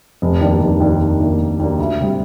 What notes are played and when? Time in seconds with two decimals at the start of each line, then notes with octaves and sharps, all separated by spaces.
0.22 F1
0.41 D#2 D#3 A#3 D4
0.61 F1
0.80 D#2 D#3 A#3 D4
1.00 F1
1.19 D#2 D#3 A#3 D4
1.40 F1
1.59 D#2 D#3 A#3 D4
1.79 D2
1.98 C3 G3